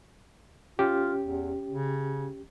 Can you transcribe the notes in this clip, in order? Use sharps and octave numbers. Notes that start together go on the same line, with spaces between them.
C#4 F4 G4
E2
C#3